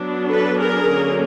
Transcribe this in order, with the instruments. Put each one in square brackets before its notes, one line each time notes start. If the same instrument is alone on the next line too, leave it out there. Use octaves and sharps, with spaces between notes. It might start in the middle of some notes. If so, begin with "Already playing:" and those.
Already playing: [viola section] F#3 B3 D4
A4 B4
G#4 A#4
D3 F#3 A#3 C#4